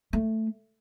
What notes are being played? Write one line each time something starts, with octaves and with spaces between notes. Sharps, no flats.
A3